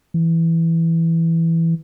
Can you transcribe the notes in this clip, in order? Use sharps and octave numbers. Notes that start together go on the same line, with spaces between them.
E3